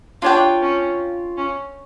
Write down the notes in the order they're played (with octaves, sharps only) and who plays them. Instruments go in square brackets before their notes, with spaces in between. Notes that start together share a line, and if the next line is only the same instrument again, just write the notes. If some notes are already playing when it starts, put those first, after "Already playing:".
[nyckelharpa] D4 [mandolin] F4 C#5 G5
[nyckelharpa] C#4
C#4